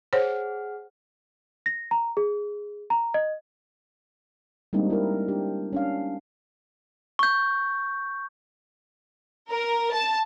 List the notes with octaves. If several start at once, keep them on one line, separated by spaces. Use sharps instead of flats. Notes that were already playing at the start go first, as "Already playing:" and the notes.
G#4 C5 C#5 F#5 F6
A#6
A#5
G#4
A#5
D#5
G3 G#3 A#3 C4 D4 D#4
E4 A#4
D4 G4
C#4 D4 F5
C#6 G6
A#4
A5